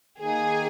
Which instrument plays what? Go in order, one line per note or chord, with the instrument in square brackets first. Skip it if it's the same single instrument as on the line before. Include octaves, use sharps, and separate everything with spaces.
[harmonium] D#3 A#3 D#4 [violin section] G#4